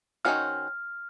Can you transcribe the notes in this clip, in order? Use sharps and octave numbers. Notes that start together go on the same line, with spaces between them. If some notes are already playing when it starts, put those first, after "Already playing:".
D#3 A#3 C#4 F#4 C5 F6